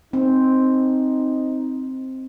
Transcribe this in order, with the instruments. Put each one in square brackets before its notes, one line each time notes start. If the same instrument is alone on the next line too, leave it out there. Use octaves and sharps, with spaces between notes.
[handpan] C4 [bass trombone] D#4